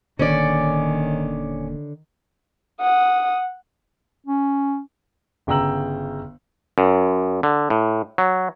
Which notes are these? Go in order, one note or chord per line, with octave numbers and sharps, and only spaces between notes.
D#1 D#2 D3 D#3 A#3 C#4 C#5 D5
F#5 D#6
C#4
G1 C#3 G5 A#5 E6 F#7
F#2
D3
A2
F#3